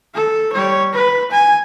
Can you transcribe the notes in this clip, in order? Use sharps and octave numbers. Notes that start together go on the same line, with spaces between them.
A4
G3 C#5
B4
G#5